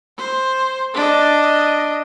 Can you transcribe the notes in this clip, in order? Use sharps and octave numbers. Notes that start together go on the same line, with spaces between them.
C5
D4 D#5